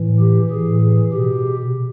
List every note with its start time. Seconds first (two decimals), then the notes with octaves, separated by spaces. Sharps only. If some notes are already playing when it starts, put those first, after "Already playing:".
Already playing: A2 E3
0.20 G4
0.50 A2 E3 G#4
0.82 G#4
1.12 B2 G4